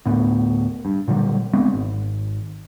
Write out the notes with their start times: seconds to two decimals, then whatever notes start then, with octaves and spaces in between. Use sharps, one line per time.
0.06 D2 A2 B3
0.85 G2
1.08 A#2 D3 F#3 G3
1.54 D2 G#3 B3 C4
1.74 G#1